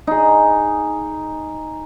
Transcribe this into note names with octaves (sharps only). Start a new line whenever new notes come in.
D#4 G#4